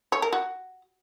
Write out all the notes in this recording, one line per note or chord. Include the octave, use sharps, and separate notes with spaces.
C#5
A#4
F#4